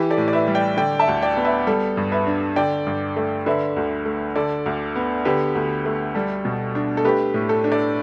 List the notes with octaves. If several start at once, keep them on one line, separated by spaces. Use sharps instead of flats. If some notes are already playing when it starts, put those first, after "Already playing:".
Already playing: E3 G4 B4
A4 D5
A2
D5
B4 E5
G3
D5 G5
D3 D5 G5
E5 A5
D2
D5 G5
B3
B4 E5
G3 A4
G2
B4 E5
D4
D3 D5 G5
G2
A3
D3 B4 E5
D2
A3
D3 A4 D5
D2
B3
D3 G4 B4
D2
A3
G3 A4
B2
D4
A4
A3 G4 B4
A2
A4
D4
A4 D5